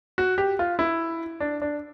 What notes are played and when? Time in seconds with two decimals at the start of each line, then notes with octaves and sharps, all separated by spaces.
0.18 F#4
0.38 G4
0.59 F4
0.79 E4
1.40 D4
1.62 D4